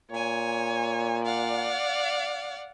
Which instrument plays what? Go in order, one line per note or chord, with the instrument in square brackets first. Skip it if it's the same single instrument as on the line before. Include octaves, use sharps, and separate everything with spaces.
[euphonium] A#2 [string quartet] C#5 G#5
[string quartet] D5 F5 F#5